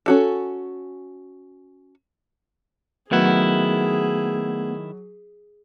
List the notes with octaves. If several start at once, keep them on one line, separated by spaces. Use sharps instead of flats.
C#4 F#4 A4
D#3 F#3 A3 B3 E4 G#4 F#5